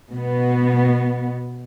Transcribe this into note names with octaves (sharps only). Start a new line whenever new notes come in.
B2 B3